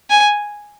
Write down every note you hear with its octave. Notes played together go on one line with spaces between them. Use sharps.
G#5